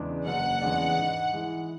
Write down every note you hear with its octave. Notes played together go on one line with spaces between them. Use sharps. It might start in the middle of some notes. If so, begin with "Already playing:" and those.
Already playing: E2 C#3 G#3 D4
F#1 F#5
E2 C#3 G#3 D4
G#2
E3 G#3